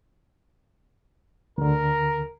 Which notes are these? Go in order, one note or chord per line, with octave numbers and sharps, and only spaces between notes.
D2 D3 A#4